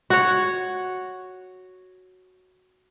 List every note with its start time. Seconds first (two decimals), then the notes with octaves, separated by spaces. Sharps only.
0.10 F#4 C#5